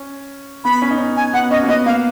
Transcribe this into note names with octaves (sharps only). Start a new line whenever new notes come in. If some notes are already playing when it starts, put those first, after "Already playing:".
Already playing: C#4
B3 B5
C#4
D#4
C#4
G#5
B3 F#5
C#4 D#5
A#3
B3 D#5
A#3 F5